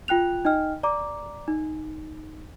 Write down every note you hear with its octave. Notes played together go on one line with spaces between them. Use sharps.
F4 G5 F#6 F7
D#4 D#5 G5 F6
D5 A#5 D6
D#4